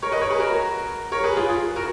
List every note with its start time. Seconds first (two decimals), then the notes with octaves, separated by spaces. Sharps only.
0.02 A#4 C#5
0.12 B4 D#5
0.21 A#4 C#5
0.30 G#4 B4
0.39 F#4 A#4
1.12 A#4 C#5
1.24 G#4 B4
1.36 F4 G#4
1.48 F4 G#4
1.76 F#4 A#4